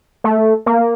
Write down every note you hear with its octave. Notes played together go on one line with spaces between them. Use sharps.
A3
A#3